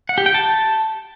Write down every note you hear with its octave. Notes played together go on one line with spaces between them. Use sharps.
F#5
G4
G5
A5